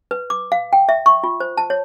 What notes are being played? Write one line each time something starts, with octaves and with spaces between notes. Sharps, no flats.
B4
D6
F5
G5
E5
C#6
F4
C5
A5
C#5